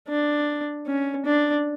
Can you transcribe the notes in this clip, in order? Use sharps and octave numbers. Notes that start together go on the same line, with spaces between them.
D4
C#4
D4